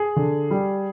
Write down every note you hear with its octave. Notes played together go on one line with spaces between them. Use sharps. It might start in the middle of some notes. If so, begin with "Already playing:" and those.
Already playing: G#4
D3
G3